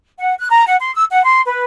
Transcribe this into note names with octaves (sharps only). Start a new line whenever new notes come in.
F#5
F#6
A#5
F#5
C6
E6
F#5
C6
B4